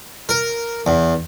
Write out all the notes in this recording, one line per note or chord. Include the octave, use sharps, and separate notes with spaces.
A#4
E2